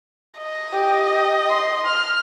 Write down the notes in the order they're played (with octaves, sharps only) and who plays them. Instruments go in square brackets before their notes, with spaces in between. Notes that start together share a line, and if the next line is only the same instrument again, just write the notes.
[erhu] D#5
[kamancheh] G4
C6
[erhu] F6